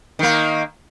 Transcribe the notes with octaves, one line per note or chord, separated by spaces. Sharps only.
D#3 A#3